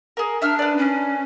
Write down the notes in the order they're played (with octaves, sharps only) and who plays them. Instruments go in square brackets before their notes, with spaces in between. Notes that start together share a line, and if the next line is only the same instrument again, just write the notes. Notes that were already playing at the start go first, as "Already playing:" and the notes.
[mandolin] G#4 A#4
[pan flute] D4 [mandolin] E5 E6 F6
[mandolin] B4 D5
[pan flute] C#4